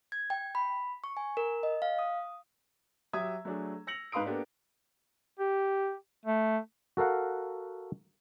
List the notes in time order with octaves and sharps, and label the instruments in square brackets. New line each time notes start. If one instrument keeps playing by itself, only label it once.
[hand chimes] G#6
G5
B5
C#6
G#5
A#4
D#5
F5
D#6
[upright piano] F#3 G4 E5 D#6 E6 G#6
F#3 A3 D4 G#4
E6 A#6 C#7 F7 F#7
G#2 B4 F5 C6 D#6 D7
A#3 B3 D4 G4 A4
[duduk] G4
A3
[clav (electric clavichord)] F#4 A4 A#4 F5 F#5